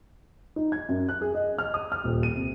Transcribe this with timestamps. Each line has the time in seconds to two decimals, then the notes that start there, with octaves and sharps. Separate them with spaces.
0.56 D#4
0.72 G#6
0.89 F#2
1.09 F#6
1.21 G#4
1.35 D#5
1.58 F6
1.74 D#6
1.92 F6
2.04 D#1
2.23 D#7
2.35 C2